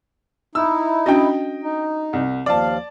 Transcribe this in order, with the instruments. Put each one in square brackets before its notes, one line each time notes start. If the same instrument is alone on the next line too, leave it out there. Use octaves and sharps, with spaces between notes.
[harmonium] D#4 E4 [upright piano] E6
[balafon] C#4 D4 F#4 [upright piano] D#5 G5
[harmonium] D#4
[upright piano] C2
[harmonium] D#2 F3 F5 [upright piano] D5 A5